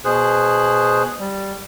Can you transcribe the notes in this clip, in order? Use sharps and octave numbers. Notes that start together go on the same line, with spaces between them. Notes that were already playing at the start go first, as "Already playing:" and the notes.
B2 G#4 C5 F#6
G3